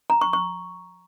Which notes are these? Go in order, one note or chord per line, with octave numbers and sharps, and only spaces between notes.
A#5
C#6
C#6